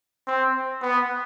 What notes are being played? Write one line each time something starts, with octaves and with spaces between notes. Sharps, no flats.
C4
B3